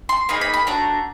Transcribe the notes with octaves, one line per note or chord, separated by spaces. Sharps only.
C6
A#3 D#4 G#4 B5
B5
B5
A3 D4 F#4 A#5